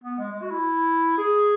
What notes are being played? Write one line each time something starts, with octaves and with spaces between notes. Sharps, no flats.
B3
G#3
G#3
F#4
E4
G#4